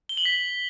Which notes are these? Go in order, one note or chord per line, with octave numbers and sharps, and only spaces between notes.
G7
F#7
B6